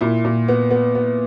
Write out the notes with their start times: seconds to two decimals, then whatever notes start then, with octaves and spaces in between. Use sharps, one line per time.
0.01 A#2 E4
0.25 A#2
0.48 B3
0.71 B3
0.95 B3